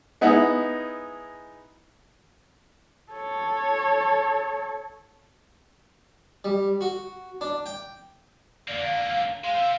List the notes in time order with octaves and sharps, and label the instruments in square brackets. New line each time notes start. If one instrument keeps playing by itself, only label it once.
[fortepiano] G#3 B3 D#4 E4
[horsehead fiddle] A4 C#5
[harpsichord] G3
F#4
D4
G5
[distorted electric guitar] D3 A#3 [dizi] D5
[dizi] F5
[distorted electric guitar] G#3 [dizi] F5
[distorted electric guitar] C4 E5